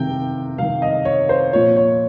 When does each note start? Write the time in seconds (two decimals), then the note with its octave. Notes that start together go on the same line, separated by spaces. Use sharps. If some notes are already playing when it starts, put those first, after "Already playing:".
Already playing: C3 D#3 G5
0.58 C3 D#3 F5
0.82 D#5
1.05 C#5
1.29 C5
1.53 A#2 F3 C#5
1.77 C#5